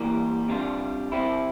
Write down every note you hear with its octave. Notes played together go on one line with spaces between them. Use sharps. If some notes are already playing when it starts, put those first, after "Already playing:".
Already playing: E3 G3 A#3
C3 G3 D4 F4
C3 G3 C4 E4